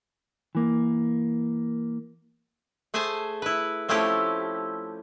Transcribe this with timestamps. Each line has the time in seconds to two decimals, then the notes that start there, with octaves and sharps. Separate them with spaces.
0.55 E3 A#3
2.94 A3 G#4 C5 G#5 A5
3.42 E4 B4
3.89 F3 A3 C4 C#4 E4 G4